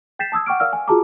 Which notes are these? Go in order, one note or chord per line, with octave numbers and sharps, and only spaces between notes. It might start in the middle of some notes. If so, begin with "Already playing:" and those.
G5 G6 A6 B6 C7 E7
A5 D#6 E6 G#6
F#5 G5 C#6 D6 F6 D7
A#4 D5 F5 E6 F6
G#5
F4 F#4 G#4 A5 A#5 D6